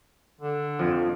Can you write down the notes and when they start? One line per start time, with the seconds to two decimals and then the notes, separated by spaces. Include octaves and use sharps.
0.41 D3
0.79 F2 F3